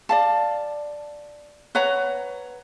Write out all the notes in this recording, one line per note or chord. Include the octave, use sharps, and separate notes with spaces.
D5 F5 A5
B4 C#5 F#5 A#5